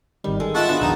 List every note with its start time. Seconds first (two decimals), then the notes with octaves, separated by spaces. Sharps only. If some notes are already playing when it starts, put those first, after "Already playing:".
0.24 G#1 D#3 G3
0.40 G#3 A4
0.55 F4 D#5 E5 F#5 G5 A5 C#6
0.69 G#3 B3 D4 F#4
0.81 A#1 E2 D#3 D4 D#4 G#4